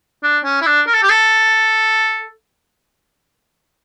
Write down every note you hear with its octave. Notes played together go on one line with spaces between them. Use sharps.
D4
C#4
E4
D4
A#4
A4
G4
A4